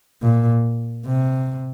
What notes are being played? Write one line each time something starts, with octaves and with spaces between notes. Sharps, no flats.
A#2
C3